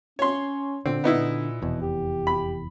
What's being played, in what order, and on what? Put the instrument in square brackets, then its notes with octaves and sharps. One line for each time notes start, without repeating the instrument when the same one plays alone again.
[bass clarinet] C#4 [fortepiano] C#5 C6
[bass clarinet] A#2 [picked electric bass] D3 [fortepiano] C4
[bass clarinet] A#2 [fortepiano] B3 D#4 E4
[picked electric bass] F1 E2 [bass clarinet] B2
[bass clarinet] G4
[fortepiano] B5